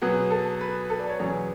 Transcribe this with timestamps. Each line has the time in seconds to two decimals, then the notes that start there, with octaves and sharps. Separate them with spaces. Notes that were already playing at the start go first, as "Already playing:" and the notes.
0.02 B2 F#3 B3 G#4
0.31 A4
0.61 B4
0.90 A4
1.00 D5
1.09 C#5
1.19 E2 B2 F#3 C#4 G#4